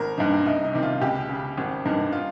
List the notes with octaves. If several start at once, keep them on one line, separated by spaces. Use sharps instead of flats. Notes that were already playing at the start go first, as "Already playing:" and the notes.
Already playing: G#1 A#4
G2 D#3
C2 D#4
D#4
C3 D#3
F4
C#2 G4
C#3
G#1
G2 D#3
F4